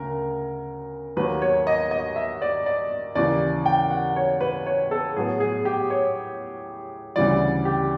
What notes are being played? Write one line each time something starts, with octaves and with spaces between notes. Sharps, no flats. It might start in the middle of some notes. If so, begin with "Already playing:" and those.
Already playing: D2 C#3 A#4
D#2 D#3 F#3 A#3 B4
C#5
D#5
D#5
E5
D5
D5
D#2 C#3 E3 D5
G5
F#5
C#5
B4
C#5
A4
A2 F#3 B3 G#4
G#4
G4
C#5
D2 C#3 E3 G3 D5
G4